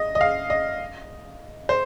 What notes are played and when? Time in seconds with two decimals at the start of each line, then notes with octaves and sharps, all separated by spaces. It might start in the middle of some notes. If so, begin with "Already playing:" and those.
Already playing: D#5
0.15 D#5
0.21 F5
0.50 D#5
1.69 C5